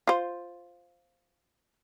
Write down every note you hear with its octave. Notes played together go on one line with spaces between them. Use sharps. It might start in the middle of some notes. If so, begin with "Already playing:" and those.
F4 C5